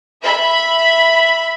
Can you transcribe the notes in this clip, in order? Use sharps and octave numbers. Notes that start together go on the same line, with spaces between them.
E5 B5